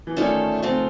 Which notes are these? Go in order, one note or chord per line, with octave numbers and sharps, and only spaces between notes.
E3
D#3 A3 C#4 F4 A4 D5
C#3 F3 A3 C4 F4